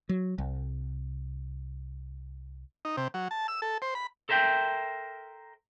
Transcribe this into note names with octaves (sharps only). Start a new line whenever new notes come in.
F#3
C2
D#4
C3
F#3
A5
E6
A4
C5
B5
A4 A#4 C5 E5 G5